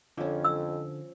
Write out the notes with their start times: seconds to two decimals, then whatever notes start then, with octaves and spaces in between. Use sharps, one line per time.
0.17 F2 D3 F3 C#4
0.45 E6